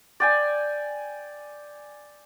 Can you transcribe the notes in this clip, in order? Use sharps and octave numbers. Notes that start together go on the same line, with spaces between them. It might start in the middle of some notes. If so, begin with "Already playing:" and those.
D5 G5 G#5